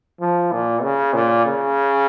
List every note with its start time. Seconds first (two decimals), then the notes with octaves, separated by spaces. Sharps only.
0.21 F3
0.52 A#2
0.83 C#3
1.14 A#2
1.45 C#3